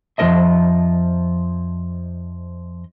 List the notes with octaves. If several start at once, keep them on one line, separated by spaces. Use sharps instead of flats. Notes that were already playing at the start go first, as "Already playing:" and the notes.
F2 F3 B3 A#4 D#5 E5